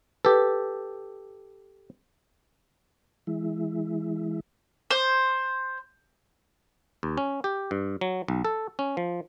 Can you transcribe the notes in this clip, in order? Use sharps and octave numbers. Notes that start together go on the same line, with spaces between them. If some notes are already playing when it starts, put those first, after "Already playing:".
G4 A4 B4
E3 G#3 E4
C5
D#2
C#4
G4
G2
F#3
B1
A4
C#4
F3